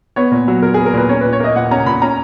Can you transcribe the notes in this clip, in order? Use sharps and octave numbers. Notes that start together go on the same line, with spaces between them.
B3 C#5
A#2
F#3
A#2 A#4
B3 G#4
A#4
A#2 B4
C#4 C#5
A#2 B4
C#5
A#3 D#5
A#2 F#5
C#4 A#5
A#2 B5
C#4 A#5